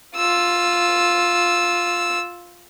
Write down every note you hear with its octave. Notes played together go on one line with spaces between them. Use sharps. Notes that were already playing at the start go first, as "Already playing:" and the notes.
F4 E6